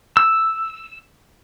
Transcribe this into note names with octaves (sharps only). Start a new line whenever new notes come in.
E6